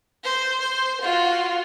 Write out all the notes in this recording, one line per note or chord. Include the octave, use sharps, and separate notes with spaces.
C5
C5
F4 F#4